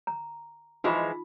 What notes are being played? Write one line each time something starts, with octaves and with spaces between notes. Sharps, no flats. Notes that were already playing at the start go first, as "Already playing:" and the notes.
A#5
E3 F3 G#3 D#4 F4 B5